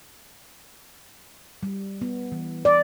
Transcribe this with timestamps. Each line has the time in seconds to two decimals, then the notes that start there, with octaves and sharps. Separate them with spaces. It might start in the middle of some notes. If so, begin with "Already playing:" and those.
1.63 G3
2.01 B3
2.32 E3
2.65 D5